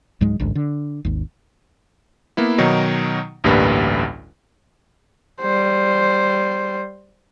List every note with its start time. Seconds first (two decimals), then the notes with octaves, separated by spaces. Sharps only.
0.21 C#2 G#2 F#3 G#3
0.40 A1 D2 G#2
0.55 D3
1.05 G#1 D#2
2.37 A#3 B3 E4
2.58 B2 D#3 F#3 D#4
3.44 A1 D2 G2 G3 A#3 B4
5.41 G3 C5